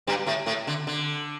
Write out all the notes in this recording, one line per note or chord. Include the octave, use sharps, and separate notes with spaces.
G2 G3
A2 A3
A2 A3
D3
D3